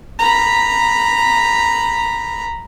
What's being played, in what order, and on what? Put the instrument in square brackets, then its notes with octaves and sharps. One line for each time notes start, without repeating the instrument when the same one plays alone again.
[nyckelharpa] A#5 B5